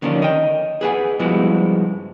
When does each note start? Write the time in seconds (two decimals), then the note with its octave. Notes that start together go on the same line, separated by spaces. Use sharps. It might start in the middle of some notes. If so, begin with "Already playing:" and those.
0.02 D3 D#3 F3 A#3 C#4 D4
0.22 D#5 G5
0.81 G#4 B4 F#5 G#5
1.19 G2 F3 G#3 B3 E4 F#4